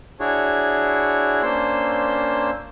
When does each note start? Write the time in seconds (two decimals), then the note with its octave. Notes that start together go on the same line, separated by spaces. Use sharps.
0.20 D4 E4 F#4 G#4 C#5
1.43 A#3 C#4 D4 C5 C6 E6